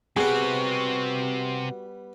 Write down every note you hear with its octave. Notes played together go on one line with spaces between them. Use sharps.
C3 G3 B3 C4 F#4 G#4